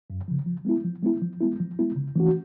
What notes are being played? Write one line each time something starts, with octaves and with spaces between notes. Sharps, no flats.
F#2
C#3 F3
F3
G#3 B3 E4
F3
G#3 B3 E4
F3
G#3 B3 E4
F3
G#3 B3 E4
C#3
E3 A3 C#4 F#4